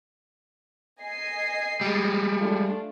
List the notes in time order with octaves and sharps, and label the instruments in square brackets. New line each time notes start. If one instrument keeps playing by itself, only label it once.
[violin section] D#5 G#5 C7
[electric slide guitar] G3 G#3
[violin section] A3 D4 F4